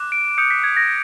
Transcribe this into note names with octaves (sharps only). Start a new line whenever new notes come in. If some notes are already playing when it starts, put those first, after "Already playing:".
Already playing: D6 F#6
D7
D#6 G6 C#7
B6
G#6
A#6